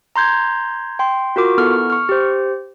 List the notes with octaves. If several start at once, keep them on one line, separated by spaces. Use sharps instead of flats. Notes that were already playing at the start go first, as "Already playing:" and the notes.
A#5 C6 G6 G#6
G5 C6
F4 F#4 A#4 D6
B3 E4 A4 C#6 F6
C#6 F6
G4 C5